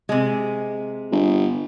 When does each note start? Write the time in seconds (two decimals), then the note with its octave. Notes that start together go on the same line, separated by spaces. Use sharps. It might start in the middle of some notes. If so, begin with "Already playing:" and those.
0.09 C3 G#3
1.12 G1